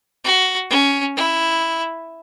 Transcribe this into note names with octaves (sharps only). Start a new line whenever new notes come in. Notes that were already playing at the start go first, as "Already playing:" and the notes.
F#4
C#4
E4